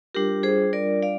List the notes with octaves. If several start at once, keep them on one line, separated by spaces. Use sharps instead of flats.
G3 D4 F4 G4 A#4
G#4 C5
A#4 D5
D5 F5